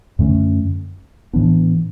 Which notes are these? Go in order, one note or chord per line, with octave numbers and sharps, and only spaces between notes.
F#2 D3 A3 C#4
A2 E3 B3 D4